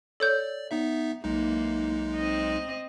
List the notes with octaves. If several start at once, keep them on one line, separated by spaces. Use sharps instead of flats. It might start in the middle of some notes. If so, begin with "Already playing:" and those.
A4 C#5 D5 G6
B3 D#4 E5
B1 E3 G#3 A#3 D#4
C4 D#5